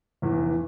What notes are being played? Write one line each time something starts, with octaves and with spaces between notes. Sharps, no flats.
F1 E2 E3